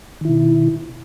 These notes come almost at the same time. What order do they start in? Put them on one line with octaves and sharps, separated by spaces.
D#3 E4 B2